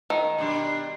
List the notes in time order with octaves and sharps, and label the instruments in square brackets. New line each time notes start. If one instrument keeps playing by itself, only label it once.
[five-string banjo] D#3
[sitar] B2 G3 D4